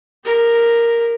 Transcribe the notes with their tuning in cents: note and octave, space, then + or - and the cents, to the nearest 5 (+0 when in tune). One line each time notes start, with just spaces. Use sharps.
G4 +40 A#4 +0